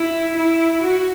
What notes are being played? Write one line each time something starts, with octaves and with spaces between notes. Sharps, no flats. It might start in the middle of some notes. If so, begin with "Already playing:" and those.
Already playing: E4
E4
F#4